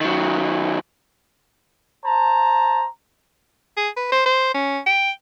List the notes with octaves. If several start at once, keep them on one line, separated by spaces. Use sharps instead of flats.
D#3 F#3
C5 A5 A#5
G#4
B4
C5
C5
C#4
G5